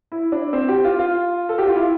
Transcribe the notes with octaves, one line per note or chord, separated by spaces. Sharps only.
E4
D4
C4
G4
F4
F4
A4
G4
F4
E4